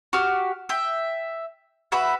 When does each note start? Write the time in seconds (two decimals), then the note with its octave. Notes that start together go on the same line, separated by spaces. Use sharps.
0.13 F#4 G4 F6
0.69 E5 G5
1.92 F#4 B4 E5 B5